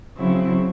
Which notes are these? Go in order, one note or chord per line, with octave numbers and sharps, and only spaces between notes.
C#3 F#3 C4 E4